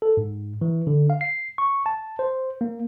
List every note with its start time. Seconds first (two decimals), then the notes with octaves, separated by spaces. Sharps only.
0.02 A4
0.17 G#2
0.61 E3
0.87 D3
1.10 F5
1.21 C7
1.58 C#6
1.86 A5
2.19 C5
2.61 A#3